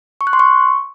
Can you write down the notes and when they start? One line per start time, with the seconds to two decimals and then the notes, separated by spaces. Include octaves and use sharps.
0.21 C#6
0.27 F#6
0.33 C6
0.39 C#6